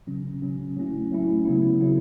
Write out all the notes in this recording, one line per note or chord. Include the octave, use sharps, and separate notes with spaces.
C#3 F#3 C#4
C#3 F#3 C#4
F#3 A3 C#4 E4
F#3 A3 C#4 E4
C#3 F#3 B3 E4
C#3 F#3 B3 E4